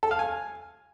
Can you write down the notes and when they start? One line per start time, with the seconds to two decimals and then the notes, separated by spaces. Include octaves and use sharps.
0.03 A4
0.11 F5
0.19 G#5